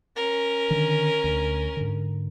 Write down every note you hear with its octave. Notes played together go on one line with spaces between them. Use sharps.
C#4 A#4
D3 D#3
D2
G#2 D3